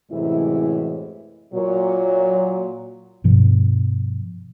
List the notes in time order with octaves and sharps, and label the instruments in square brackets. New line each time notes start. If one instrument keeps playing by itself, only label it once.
[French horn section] F#2 A2 C3 E3 G#3 E4
A#2 F#3
[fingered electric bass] G2 B2 F3